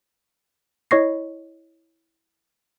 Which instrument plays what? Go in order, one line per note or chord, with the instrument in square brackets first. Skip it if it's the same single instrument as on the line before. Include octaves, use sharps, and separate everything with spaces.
[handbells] E4 C#5 D#5 C#6 A#6 C7